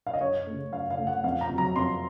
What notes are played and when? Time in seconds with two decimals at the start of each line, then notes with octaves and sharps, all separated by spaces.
0.07 F5
0.14 D#5
0.21 F#2 C#5
0.46 C#3 A3
0.73 F#2 F5
0.90 F5
0.98 C#3 A3
1.07 F#5
1.24 F2 F5
1.41 A#5
1.49 C3
1.54 F#3 A#5
1.76 F2 C6